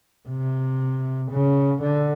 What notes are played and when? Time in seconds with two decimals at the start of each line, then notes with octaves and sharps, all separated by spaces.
0.28 C3
1.31 C#3
1.82 D3